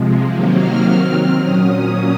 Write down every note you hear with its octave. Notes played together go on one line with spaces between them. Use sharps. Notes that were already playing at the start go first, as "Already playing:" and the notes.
Already playing: C3 F3 G#3
C3 D#3 F#3 A#3
F6
D#3 F#3 C4 F6
A#2 F#3 C#4 D#6